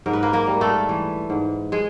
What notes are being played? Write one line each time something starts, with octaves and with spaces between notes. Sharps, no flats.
G#2 A#4
B4
A#3 A#4
A#3 A#4
G3
A3 A4
E3
G#2
G#3 G#4